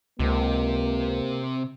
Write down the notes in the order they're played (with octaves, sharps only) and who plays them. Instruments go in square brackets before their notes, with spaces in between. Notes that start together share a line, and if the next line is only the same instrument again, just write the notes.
[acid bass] C#2 [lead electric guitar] C3 G4 [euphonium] A#3